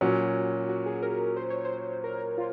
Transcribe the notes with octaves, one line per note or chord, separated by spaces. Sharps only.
A#2 F#3 C#4 F#4
F#4
G#4
A#4
C5
C#5
C5
A#4
F4